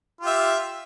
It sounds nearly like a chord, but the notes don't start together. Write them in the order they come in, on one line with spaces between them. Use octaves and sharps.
F4 G4 E5